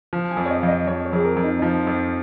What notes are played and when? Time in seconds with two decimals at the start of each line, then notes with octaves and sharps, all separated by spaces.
0.13 F3
0.31 G#5
0.37 F2
0.46 C#5
0.50 D#5
0.62 F2 F5
0.68 D#5
0.87 F2 C#5
1.05 C#5
1.13 F2 G#4
1.25 A#4
1.36 F2
1.43 D#4
1.59 F3 D#4
1.87 F2